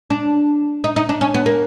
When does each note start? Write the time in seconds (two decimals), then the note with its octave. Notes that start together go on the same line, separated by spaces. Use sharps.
0.10 D4
0.84 D#4
0.96 D#4
1.09 D4
1.21 C#4
1.34 B3
1.46 A#3